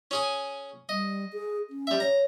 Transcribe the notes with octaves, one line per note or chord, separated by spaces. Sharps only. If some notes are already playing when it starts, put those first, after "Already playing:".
C#4 G#4 G#5
G3 D#5
G#4
C#4
G3 E5
C#5 A#5